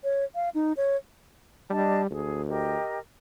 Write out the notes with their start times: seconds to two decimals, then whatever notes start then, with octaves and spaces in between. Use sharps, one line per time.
0.04 C#5
0.35 F5
0.55 D#4
0.77 C#5
1.70 G3 D4 D#5 A5
2.11 D2 G#4
2.47 G4 A#4 D#5